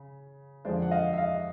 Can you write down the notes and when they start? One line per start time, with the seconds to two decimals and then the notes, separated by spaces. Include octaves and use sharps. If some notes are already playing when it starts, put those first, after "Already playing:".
Already playing: C#3
0.65 F2 D3 F3 G#3 C5 D5
0.82 F#5
0.91 D#5 F5
1.13 E5
1.18 D#5 F5